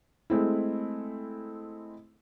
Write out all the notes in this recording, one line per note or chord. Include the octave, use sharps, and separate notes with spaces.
G#3 A3 C4 E4